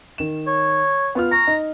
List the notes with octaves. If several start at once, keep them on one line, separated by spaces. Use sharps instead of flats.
D#3 E7
C#5
B3 F4 F6
A#5 C#6
D#4